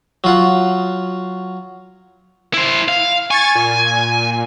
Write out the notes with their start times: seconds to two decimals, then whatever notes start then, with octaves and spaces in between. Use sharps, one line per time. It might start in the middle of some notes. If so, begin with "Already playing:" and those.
0.24 F#3 F4 F#5
2.54 E4 C5
2.88 F5
3.31 G#5 C#6 G#6 A6
3.55 A#2